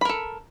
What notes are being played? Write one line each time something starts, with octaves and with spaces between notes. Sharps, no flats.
A4 A#4 B5